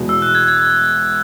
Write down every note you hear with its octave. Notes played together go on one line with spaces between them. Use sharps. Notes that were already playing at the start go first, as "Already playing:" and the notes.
Already playing: E2 B2 G#3
E6
F#6
G#6
G#6